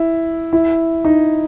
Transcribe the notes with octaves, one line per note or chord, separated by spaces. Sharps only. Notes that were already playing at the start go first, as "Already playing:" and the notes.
Already playing: E4
E4
D#4